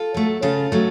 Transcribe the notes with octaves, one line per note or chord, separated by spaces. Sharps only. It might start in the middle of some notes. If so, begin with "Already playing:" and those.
Already playing: F4 A4
F#3 A3
C#3 F4 A4
F#3 A3